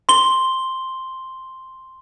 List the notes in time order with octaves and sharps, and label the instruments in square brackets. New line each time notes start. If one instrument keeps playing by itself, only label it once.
[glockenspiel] C6 G7